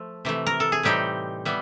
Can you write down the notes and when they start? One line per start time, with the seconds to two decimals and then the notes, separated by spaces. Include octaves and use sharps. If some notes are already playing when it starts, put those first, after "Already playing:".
Already playing: F3 A3
0.25 C3 E3 A3
0.46 A#4
0.60 A4
0.72 G#4
0.83 A2 E3 G3 C4 D#4 G4
1.45 E3 G3 B3